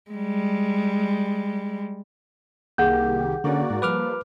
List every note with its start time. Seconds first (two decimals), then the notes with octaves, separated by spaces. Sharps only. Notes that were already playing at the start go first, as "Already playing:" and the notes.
0.11 G3 G#3
2.78 C2 D#3 A#3 G4 G#4 F#5 G6
3.44 D3 A#3 C#4 F#4 D5
3.70 G#2
3.82 F3 G3 A#3 B4 D6 F6